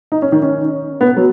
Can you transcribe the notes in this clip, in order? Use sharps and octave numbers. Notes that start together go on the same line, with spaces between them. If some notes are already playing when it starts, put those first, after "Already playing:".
D#4
C#4
D#3
C#4
B3
F#3